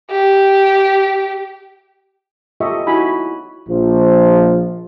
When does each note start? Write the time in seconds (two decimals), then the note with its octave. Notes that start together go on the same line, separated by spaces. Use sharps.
0.11 G4
2.60 F4 G4 A4 D#5 E5 C#6
2.87 D#4 E4 F#4 G#5 B5
3.69 A#1 F3